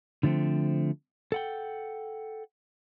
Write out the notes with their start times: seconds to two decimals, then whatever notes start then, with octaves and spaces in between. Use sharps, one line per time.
0.23 D3 F3 A3 C4
1.32 A4 F#5 G5